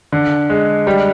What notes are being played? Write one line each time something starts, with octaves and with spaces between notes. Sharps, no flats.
D3
G#3
G3